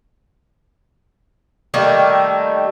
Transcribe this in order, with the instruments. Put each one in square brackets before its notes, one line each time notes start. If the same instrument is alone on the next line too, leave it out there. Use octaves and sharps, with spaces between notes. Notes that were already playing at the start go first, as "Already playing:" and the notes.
[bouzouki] D#3 G3 A3 A#3